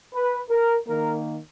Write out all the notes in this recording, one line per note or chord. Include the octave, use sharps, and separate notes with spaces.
B4
A#4
D#3 A#3 A#4